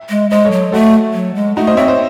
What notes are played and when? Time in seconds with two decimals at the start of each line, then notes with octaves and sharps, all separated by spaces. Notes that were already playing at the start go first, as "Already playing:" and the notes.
Already playing: E5
0.10 G#3
0.30 G#3 C5 D#5
0.45 A4 C#5
0.51 F#3
0.72 A3 F#4 A4
1.14 F#3
1.35 G#3
1.56 A3 D#4 F#4
1.67 C5 D#5
1.77 C4 C#5 E5
1.87 C5 D#5